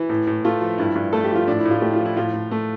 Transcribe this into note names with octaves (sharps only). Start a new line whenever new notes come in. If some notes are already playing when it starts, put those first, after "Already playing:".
Already playing: E3 E4
A2
A2
A3 F4
F3
G2 E4
G2
A3 A4
G4
F3
F4
A2 D4
E4
A2
F4
A3 G4
F4
F3
E4
A2 F4
A2
A3